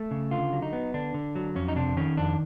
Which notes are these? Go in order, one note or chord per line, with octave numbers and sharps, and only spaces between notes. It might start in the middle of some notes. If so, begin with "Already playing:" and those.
Already playing: A3
C#3
D3 F4
F#3
D#4
B3
D3 D4
D3
F#3
F2 C#4
D#4
C3 D4
D#3 C#4
F2 D4